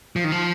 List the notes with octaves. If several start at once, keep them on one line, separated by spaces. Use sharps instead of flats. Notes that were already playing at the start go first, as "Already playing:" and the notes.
F3
D#3
F3